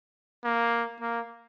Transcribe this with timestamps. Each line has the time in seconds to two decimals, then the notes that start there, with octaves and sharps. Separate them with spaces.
0.44 A#3
1.00 A#3